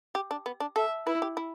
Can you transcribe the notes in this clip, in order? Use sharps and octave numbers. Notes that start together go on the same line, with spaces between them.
G4
D4
B3
D4
A4 E5
E4 B4
G4
E4